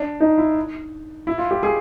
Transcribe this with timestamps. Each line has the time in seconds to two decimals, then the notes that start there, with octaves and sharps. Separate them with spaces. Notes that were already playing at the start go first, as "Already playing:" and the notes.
Already playing: D4
0.20 D#4
0.38 E4
1.27 E4
1.38 F4
1.51 G4
1.63 G#4